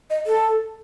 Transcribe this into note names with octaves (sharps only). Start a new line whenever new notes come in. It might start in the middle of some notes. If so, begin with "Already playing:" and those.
D#5
A4